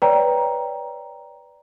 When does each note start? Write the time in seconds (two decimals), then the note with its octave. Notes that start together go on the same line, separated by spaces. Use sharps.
0.02 B4 C#5 D5 G5 A#5